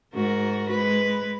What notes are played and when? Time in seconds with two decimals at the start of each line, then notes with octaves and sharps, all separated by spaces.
0.14 G#2 F#4 A#4
0.70 G#3 B4